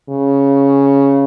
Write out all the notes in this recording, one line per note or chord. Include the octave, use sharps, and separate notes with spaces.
C#3